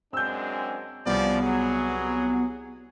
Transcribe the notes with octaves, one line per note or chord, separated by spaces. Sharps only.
F#2 G#3 C4 D4 E6 G6
C2 G2 C#3 F3 B3 D5
F#3 G#4